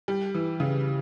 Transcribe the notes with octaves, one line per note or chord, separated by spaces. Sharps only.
G3
E3
C#3